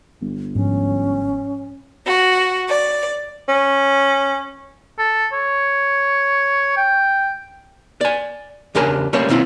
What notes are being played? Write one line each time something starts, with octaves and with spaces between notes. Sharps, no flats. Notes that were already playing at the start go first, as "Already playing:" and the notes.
G1
G#2 F3 F#3 C#4
F#4
D5
C#4
A4
C#5
G5
D5 G#5
E2 C#3 D4 G4 A#4 G#5
G3 A3 A#3 C#4 C5 C#5
B1 D#3 C4 E4 F4